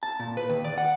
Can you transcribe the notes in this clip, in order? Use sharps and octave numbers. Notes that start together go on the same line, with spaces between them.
A5
A#2
B4
D#2
D5
F#5